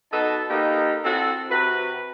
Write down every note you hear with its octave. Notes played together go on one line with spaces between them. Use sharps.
B2 D#4 A4 D#5 A5
A#3 D#4 G4 A4 B4
C4 E4 F#4 A4
C3 F#4 B4